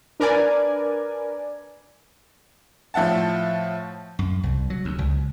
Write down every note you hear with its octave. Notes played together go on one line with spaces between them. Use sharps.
D4 A#4 B4 D5 G#5
A2 F3 E5 F#5 A5
F#2
C2
F#3
D2
C#2